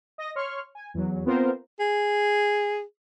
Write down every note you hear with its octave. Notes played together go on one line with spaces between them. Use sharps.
D#5 A#6
C#5 C6 C#6 F6
G#5
E2 F#3
B3 C4 F4 A#4 C5
G#4